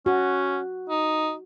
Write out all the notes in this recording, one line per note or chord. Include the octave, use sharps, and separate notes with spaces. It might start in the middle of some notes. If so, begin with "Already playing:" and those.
C#4 F#4
D#4